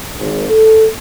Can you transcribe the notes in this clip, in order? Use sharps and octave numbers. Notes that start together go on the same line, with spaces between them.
G#1
A4